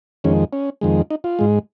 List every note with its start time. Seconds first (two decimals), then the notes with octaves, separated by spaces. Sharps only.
0.24 F2 D#3 G#3 C#4
0.53 C#4
0.81 F2 D#3 G#3
1.10 D#4
1.24 F4
1.39 G#2 G#3